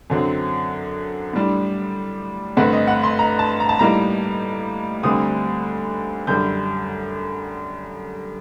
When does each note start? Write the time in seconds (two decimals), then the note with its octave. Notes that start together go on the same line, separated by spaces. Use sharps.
0.10 F#2 D3 F#3 C4
1.33 A2 G3 D4
2.57 G2 D3 A3 C4 F#5
2.73 D#5
2.87 F#5
3.03 C6
3.19 A#5
3.39 A5
3.60 A#5
3.69 A5
3.79 A2 G3 A#3 D#4 A#5
5.03 D2 D3 G3 C4 D#6
6.27 F#2 D3 G3 G6